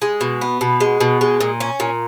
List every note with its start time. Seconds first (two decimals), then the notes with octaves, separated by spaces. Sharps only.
0.02 G#3
0.21 B2
0.41 B3
0.61 B2
0.80 G#3
1.00 B2
1.21 G#3
1.41 A#2
1.60 C#4
1.80 A#2